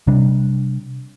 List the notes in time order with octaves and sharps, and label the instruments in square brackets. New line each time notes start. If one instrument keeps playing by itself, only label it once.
[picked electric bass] C3 G3 D4